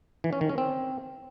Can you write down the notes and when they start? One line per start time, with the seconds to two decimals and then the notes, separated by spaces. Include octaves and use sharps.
0.24 E3
0.33 C#4
0.41 D#3
0.49 C#4
0.58 C4